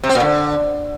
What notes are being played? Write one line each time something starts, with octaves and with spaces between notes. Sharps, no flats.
C3
C4
A#2
D3